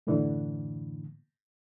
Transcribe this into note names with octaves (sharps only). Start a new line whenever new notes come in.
F#2 A2 D3 E3